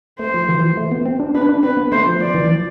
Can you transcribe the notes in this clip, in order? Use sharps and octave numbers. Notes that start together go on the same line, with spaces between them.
A3 C5
F3
E3
F3
A3
B3
C4
D4
D4 B4
D4
C4 B4
B3
A3 C5
F3
F3 D5
E3
F3